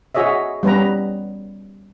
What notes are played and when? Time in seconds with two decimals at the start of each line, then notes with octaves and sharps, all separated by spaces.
0.15 F#4 G#4 C#5 D#5 E5
0.63 G3 B3 C#4 B4 A#5